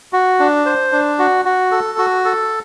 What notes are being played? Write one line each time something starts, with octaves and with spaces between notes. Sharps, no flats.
F#4
D4
C5
D4
F#4
F#4
A4
F#4
A4